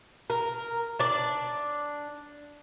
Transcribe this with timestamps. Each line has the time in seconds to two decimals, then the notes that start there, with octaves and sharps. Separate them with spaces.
0.30 A#4
0.99 D4 D5